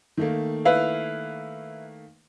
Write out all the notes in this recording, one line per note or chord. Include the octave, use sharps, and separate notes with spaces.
D#3 A3 A#3
E4 B4 F5